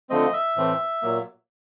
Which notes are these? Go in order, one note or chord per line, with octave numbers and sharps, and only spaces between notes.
D3 F3 A3 C4 D#5
E5
A2 E3 A3 C4
A#2 F#3 A#3